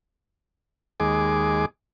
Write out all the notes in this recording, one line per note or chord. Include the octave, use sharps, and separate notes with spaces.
D#2 G#3 G#4 D6